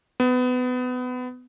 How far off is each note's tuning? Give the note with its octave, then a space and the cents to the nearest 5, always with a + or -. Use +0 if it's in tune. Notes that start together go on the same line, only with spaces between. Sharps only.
B3 +25